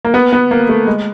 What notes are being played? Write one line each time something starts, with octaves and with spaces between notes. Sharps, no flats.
A#3
B3
B3
A#3
A3
G#3